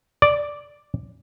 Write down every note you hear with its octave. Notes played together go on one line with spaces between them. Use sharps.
D5